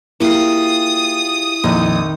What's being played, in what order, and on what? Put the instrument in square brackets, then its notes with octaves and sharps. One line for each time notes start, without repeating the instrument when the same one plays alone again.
[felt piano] A#3 [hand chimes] E4 C7 [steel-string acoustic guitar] F4 G4 G#4 [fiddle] D#6
[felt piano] A#1 F2 D#5 [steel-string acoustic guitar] D#3